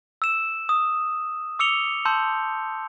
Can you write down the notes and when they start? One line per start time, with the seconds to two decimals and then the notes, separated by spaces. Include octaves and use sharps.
0.22 E6 E7
0.69 D#6
1.59 D6 E6 C#7 F7 G7
2.05 A5 C6 E6 G6